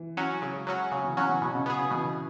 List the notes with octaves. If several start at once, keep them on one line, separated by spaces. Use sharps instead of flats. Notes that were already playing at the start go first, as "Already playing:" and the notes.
Already playing: E3
F#3 C#4 F#4
C#3 F#3
G#3
F#3 C#4 F#4
C#3 F#3
E3
C#3 F#3 C#4 F#4
E3
B2 F#3
C#3
B2 B3 G#4
C#3
B2 E3